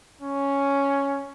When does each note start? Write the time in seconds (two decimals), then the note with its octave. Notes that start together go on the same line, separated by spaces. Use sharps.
0.21 C#4